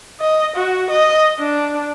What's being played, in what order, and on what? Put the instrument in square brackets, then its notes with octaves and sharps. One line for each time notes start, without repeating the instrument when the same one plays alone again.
[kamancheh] D#5
F#4
D#5
D4